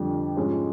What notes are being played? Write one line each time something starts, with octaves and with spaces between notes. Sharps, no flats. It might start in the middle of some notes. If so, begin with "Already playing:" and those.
Already playing: F2 D3 G3
G#2 F3 G#3 C#4